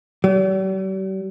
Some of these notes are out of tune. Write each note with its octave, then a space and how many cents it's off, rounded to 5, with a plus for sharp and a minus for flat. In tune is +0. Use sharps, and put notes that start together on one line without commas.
G3 -45